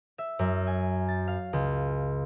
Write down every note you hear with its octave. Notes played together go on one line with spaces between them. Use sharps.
E5
F#2
G#5
A6
F5
C#2